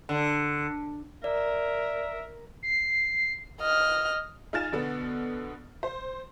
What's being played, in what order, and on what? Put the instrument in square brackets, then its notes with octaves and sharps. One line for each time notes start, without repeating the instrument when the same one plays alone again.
[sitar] D3
[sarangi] A#4 [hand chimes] D5 [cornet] E5
[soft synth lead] C7
[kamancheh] D#5 F6
[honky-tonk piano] D#4 F4 G#5 F6 A6 E7
B2 D3 B3
C5